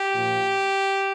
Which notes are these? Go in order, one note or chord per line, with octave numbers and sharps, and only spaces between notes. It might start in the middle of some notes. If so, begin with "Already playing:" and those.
Already playing: G4
A#2 F3